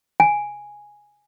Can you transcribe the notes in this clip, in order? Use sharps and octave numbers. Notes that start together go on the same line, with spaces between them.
G#5